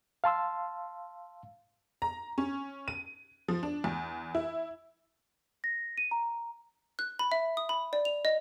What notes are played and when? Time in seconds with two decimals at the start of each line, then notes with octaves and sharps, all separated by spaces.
0.24 F5 A5 C6 E6
2.02 A#5
2.38 C#4
2.88 D#7
3.48 F3
3.63 D4
3.84 E2
4.35 E4
5.64 A#6
5.98 D#7
6.11 A#5
6.99 F#6
7.19 B5
7.32 E5
7.57 D#6
7.69 B5
7.93 D5
8.05 F7
8.25 D#5